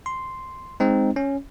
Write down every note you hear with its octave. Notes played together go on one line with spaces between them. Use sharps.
C6
G#3 C4 D#4
C#4